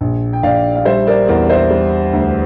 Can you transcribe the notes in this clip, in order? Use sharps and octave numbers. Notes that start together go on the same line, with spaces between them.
A#1
G5
A#1 D5 F5
F5
G3 C5 E5
A#4 D5
E2 A#4 D5
C5 E5
G3
D2